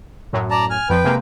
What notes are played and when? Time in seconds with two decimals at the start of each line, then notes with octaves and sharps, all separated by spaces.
0.33 F#2 A2 F#3
0.51 D5 A5 A#5
0.70 G#5 F6
0.90 F2 F3 B4 G5
1.04 C3 G#3 A#3